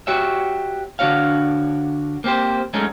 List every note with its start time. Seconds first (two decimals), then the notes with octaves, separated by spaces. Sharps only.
0.07 F#4 G4 C#5 E5
0.99 D3 D4 F#4 C#5 F5
2.24 A#3 C4 G4 C5
2.73 F#2 G#3 A3 C#4 D#4